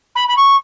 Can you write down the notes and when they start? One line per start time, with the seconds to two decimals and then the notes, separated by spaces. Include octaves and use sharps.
0.15 B5
0.28 B5
0.37 C#6